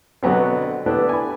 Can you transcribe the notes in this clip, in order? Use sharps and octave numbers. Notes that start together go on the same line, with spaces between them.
B2 D3 F#3 B3 C4
A3 B3 D4 E4 G4 B4
G#5 B5